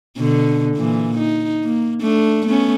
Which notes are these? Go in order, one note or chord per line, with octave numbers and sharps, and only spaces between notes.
B2 D3
A#2 E3
D#4
A#3
A3 D4
A3 B3 C#4